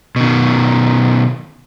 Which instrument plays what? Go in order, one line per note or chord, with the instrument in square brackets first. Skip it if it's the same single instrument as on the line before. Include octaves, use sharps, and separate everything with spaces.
[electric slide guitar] B2 D#3